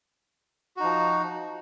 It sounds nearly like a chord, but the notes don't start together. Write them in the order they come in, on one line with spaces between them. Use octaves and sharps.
F#4 D#4 F3